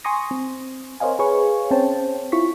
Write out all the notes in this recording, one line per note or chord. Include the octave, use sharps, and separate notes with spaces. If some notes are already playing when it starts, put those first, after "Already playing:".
G#5 C6 C#6 D#6 A#6
C4
A#4 C5 C#5 D#5 F5 G#5
G#4 B4 C#5 F5 G#5 C#6
C4 C#4 C5 C#5 G5 A5
E4 F4 C#6 B6